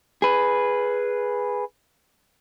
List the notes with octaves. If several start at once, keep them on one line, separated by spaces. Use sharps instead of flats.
G#4 B4